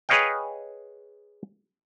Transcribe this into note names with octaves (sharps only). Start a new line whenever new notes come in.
G#4 B4 C#5 D#5 F5 G5